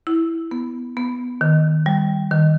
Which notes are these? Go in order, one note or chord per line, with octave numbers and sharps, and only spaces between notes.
E4
B3
B3
D#3
G3
D#3